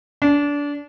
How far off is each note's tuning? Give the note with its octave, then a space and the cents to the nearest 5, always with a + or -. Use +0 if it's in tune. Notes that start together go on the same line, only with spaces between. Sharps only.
D4 -25